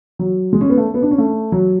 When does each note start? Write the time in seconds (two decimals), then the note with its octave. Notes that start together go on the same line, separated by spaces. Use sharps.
0.19 F#3
0.53 G#3
0.61 C#4
0.70 B3
0.77 A3
0.94 B3
1.02 D4
1.11 C#4
1.18 A3
1.52 F#3